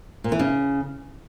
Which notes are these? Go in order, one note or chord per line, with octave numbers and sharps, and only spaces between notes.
A#2
E3
C#3